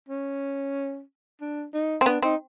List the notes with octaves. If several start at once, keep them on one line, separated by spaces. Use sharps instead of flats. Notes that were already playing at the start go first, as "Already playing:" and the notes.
C#4
D4
D#4
C4
B3 D4
C4 D#4